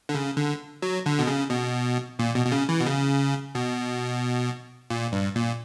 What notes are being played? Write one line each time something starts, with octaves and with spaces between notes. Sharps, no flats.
D3
C#3
D3
F#3
D3
B2
C#3
B2
A#2
B2
B2
C#3
E3
B2
C#3
B2
A#2
G2
A#2